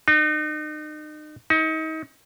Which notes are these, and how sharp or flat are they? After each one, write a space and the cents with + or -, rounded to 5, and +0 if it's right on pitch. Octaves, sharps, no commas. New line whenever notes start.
D#4 -40
D#4 +30